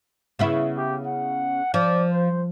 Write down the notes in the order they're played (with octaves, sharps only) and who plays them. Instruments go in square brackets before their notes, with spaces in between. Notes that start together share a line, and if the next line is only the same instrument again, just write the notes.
[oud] C#3 B3 E4
[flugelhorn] G4
F#5
[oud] F3 [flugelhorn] D5
[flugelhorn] C5